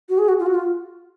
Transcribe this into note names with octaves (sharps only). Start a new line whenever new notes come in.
F#4
G#4
F#4
F4
F#4
F4